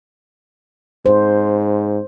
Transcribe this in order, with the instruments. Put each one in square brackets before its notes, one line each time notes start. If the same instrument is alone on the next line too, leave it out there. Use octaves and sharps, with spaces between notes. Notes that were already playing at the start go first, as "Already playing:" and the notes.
[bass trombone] G#2 [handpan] C5